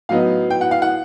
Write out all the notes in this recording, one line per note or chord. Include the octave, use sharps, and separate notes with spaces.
A2 F#3 B3 D#4 F5
G5
F#5
F5
F#5